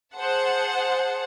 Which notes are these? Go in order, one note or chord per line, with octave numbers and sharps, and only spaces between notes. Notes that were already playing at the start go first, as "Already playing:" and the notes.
G#4 C5 F#5 A5